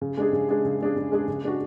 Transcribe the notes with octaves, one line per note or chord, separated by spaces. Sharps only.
C#3
G#3 D4 G#4
C#3
G#3 D4 G#4
C#3
G#3 D4 G#4
C#3
G#3 D4 G#4
C#3
G#3 D4 F#4